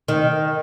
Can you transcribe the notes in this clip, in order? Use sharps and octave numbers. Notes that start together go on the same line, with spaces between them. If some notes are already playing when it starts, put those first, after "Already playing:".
D#3